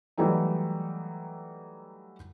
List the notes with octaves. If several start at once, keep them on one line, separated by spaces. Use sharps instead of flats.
E3 F#3 G3 A3 D#4